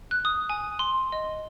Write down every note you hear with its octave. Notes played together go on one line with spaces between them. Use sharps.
F#6
D#6
G#5
C6
D#5